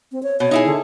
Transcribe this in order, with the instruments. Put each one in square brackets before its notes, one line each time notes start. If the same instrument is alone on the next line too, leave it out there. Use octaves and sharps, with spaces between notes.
[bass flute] C4
C#5
[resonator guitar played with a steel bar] B2 [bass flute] C#5
[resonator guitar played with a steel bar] D#4 E4 G#4
[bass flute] D3